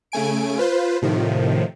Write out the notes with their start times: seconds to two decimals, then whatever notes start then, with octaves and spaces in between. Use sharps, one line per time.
0.12 C#3 A3 G#5 D7
0.58 F4 B4 C5
1.02 A2 C3 D#3 F3